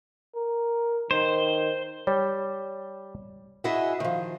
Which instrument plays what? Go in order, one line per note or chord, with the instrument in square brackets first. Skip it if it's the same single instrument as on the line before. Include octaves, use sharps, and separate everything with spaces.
[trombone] A#4
[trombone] D#3 [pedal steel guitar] C5
[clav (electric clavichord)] G3 [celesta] C#5
[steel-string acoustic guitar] E4 F#4 G#4 D#5 E5
D#3 F3